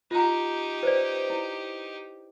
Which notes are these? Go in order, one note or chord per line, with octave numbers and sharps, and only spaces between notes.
D#4 F4 G4 A#5
B4 C5 D5
E4